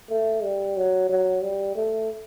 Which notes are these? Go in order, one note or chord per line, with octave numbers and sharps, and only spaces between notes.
A3
G3
F#3
F#3
G3
A3